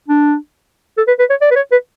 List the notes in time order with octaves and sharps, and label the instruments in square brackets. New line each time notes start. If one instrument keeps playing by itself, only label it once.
[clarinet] D4
A4
B4
B4
C#5
D5
B4
C#5
B4